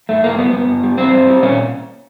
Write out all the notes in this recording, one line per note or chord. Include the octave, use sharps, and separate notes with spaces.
G2 A3
G2 A#3
G3 B3
G2 B3
G2
G3
G2 C4
G2
G3
A#2 C#4